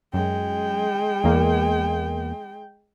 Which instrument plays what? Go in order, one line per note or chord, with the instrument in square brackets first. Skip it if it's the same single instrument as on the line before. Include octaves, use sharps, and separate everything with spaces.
[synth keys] F#2 [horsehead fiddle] G#3 G5
[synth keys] E2 A#3